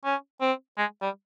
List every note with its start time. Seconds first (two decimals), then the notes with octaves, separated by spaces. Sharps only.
0.05 C#4
0.41 C4
0.78 G#3
1.02 G3